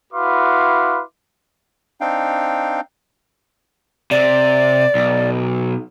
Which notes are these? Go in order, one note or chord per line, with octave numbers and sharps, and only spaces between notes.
E4 F#4 B4 F5 C6 D6
C4 D4 D#4 F5 G5
C3 D5
B1